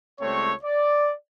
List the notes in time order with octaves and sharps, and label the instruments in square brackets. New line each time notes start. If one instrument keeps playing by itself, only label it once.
[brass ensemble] C#2 G3 A3 C4 C#5
D5